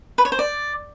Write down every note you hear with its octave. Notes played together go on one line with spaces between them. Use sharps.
B4
C#5
C5
D5